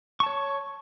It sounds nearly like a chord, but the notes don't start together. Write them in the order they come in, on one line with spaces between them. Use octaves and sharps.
C#6 A5 C#5